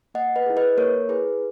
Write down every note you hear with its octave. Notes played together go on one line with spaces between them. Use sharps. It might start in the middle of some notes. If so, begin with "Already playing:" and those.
A#3 D#5 F#5
B4 D#5
E4 G#4
B4 D#5
A#3 A#4 C#5
E4 G#4 B4